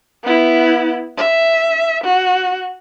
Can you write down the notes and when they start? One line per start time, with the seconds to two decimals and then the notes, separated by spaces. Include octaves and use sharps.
0.23 B3 E4
1.17 E5
2.04 F#4